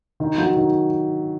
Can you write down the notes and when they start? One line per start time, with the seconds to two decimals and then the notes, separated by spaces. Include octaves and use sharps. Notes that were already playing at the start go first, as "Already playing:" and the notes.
0.20 D#3
0.38 F#3
0.57 D#3